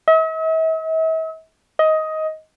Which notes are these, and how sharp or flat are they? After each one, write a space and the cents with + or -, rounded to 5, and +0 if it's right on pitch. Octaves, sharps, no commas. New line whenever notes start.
E5 -45
D#5 +15